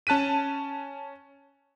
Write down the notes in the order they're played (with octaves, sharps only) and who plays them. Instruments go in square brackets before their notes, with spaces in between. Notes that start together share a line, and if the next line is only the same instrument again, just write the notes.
[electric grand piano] C#4 A5 F#6 B6 D#7